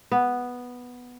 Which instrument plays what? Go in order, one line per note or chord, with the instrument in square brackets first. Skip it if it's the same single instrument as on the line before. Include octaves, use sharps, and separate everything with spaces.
[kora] B3